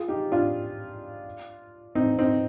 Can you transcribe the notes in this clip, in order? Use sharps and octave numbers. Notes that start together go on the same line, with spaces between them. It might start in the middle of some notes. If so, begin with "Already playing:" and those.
Already playing: F4 G#4
D#4 G4
D4 F4
C4 D#4
C4 D#4